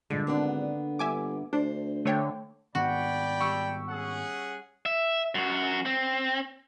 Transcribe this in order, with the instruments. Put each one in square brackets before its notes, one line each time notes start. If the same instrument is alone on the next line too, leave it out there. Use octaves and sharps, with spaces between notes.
[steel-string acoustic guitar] G2 A#2 G#3 [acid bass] D3
[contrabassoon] G#1 [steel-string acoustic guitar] A#3 B3 D4
[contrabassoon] G1 [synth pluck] E5 G#5 D6
[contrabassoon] D2 [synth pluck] D4 [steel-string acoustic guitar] C5
[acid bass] D3 [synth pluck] A3 C#5 G5
[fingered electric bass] G#2 D#3 B3 [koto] F#4 [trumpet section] D5 G5 B5
[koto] G3 [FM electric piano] C#6 E6
[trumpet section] C#4 G#4 F#5
[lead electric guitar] E5
F#2 F#4
C4